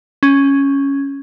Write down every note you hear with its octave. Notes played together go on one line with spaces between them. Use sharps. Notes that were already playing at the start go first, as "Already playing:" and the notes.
C#4